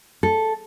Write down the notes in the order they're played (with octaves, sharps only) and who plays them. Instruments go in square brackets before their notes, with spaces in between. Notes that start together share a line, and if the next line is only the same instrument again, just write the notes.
[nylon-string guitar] A4